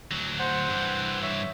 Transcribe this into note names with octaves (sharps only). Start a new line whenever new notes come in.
D2 F#3
C5 F#5
G2 E3
C#5 E5